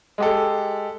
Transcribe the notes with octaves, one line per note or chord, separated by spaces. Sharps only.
G#3 G4 A4